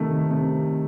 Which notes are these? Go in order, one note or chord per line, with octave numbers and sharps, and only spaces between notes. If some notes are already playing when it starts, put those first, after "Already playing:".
Already playing: C3 D#3 A3
C3